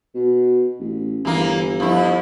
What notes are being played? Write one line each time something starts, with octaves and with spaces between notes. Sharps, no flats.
B2
A1
G1 E3 A#3
F2 E4